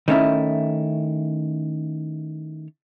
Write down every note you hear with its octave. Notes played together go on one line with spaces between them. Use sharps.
D#3 A3 C#4 E4